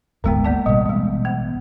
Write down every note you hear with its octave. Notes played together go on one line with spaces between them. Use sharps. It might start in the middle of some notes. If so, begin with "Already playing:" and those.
D1 G#1 D3 G#3 B3 G5
A#3 D5 A5
A1 B2 G3
G3 G#3
B3